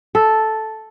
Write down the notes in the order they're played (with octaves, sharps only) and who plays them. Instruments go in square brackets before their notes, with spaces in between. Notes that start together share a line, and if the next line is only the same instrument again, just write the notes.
[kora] A4